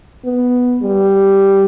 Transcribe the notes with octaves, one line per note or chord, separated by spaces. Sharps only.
B3
G3